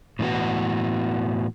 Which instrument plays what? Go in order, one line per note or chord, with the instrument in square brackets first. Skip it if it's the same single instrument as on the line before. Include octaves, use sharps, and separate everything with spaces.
[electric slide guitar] A2 E3 B3 F#4